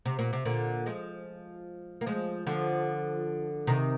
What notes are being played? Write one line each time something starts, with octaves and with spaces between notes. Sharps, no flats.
C3
A#2
C3
A#2 D3
F3 G#3
A#3
F3 G#3
D3 F3
C3 D#3